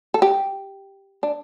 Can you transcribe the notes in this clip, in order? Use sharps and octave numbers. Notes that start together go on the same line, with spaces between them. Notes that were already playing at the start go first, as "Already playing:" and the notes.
A4
G4
D4